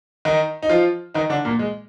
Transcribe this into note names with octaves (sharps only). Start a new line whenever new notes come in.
D#3 D#4
D#4
F3 F4
D#3 D#4
D3 D4
A#2 A#3
G#3